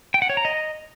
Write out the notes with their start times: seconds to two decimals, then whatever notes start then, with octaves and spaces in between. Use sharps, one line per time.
0.14 G5
0.22 F#5
0.30 C#5
0.37 A#5
0.45 D#5